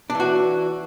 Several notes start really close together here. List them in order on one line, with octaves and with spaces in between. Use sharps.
D4 E3 F#4